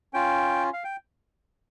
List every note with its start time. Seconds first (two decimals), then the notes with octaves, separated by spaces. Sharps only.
0.14 C#4 F4 G5
0.73 F5
0.84 G5